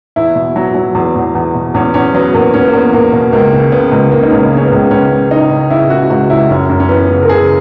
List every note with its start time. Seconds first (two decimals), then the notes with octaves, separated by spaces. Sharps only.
0.16 E2 E4
0.36 B2
0.56 F#3
0.75 F#3
0.95 E2
1.15 E2
1.35 E2
1.55 B2
1.74 E2 C#4
1.94 E2 C#4
2.14 F#3 B3
2.33 E2 A#3
2.54 E2 C#4
2.61 B3
2.68 A#3
2.73 E2 B3
2.93 E2 A#3
3.13 B2
3.33 C#2 A#3
3.53 C#3
3.72 C#3 B3
3.92 C#2
4.12 C#3 A#3
4.23 D#4
4.31 C#2 C#4
4.39 B3
4.52 C#3 C#4
4.65 B3
4.72 C#2
4.91 C#2 C#4
5.11 C#3
5.31 C#3 D#4
5.50 C#3
5.70 C#3 E4
5.90 C#3 F#4
6.10 C#2 F#4
6.30 C#2 E4
6.50 F#2 C#4
6.69 F#2
6.80 C#4
6.89 E3 B3
7.09 C#3
7.23 A#4
7.29 C#3 G#4